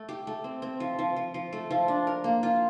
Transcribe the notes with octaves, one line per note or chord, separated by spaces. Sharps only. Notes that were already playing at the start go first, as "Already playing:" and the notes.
Already playing: A3
G4
A3
C4
C4
F3
F3
F3
F3
A3
F3
D4
A#4
A#3
F4